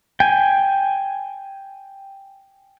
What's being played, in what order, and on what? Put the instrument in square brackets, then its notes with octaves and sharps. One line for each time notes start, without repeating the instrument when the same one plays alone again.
[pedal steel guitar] G5 G#5